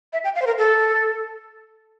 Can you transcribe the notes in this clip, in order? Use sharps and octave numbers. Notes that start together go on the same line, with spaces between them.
E5
G5
F5
C5
A#4
A4